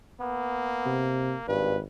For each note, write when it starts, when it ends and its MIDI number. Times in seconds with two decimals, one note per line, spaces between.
0.20 1.45 58
0.20 1.08 59
0.86 1.35 48
1.48 1.82 32
1.48 1.75 43
1.48 1.81 71